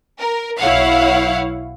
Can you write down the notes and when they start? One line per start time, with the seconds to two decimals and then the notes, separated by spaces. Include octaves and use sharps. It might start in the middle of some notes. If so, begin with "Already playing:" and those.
0.21 A#4
0.58 B1 E4 C#5 F5 F#5